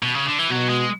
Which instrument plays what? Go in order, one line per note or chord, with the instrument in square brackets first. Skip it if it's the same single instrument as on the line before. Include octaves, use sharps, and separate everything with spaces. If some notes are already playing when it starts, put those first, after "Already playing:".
[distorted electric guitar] B2
C#3
D3
E3
[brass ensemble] B2 [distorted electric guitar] F#3
[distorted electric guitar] G#3